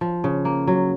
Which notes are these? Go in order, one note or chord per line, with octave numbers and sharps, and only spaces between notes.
F3
C#3
A#3
F#3